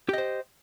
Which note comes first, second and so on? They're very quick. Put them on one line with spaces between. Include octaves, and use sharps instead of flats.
G4 D#5 C5